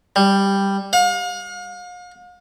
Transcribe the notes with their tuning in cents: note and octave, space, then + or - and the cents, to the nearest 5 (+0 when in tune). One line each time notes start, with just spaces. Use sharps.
G3 +5
F5 +40